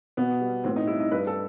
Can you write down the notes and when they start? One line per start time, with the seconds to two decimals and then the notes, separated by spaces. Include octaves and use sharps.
0.17 B2 B3
0.40 G3
0.64 A2 C4
0.76 D#4
0.87 G3 E4
1.00 D#4
1.11 G2 B4
1.27 A4